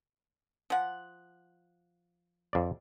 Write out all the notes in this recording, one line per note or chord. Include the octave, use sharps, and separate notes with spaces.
F3 F#5
F2 D5